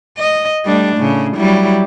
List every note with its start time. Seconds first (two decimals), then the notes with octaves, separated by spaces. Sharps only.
0.19 D#5
0.65 G3 A3 D4
0.97 A2 C#3
1.36 F#3 G3 E4